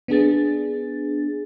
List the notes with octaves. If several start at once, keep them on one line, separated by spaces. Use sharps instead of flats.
B3 D4 G#4 A6